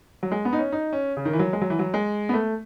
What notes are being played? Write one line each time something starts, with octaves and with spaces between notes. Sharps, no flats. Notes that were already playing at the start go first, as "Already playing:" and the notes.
F#3
G#3
B3
D#4
C#4
D#4
C#4
C#3
D#3
E3
F#3
G#3
F#3
E3
F#3
G#3
B3
A3